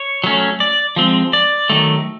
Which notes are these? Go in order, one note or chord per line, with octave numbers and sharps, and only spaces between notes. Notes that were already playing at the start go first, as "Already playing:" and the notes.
Already playing: C#5
F#3 A3 C#4
D5
F3 G#3 C4
D5
D#3 F#3 A3